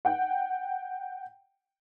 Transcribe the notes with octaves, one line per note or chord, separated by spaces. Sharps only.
F#5 G5